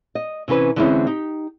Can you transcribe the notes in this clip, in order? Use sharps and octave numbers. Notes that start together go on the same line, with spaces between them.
D#5
C3 E3 C#4 B4
D3 E3 G#3 C4 C#4 E4
D#4 G4